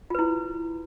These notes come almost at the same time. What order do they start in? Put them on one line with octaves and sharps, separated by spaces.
F4 B4 E4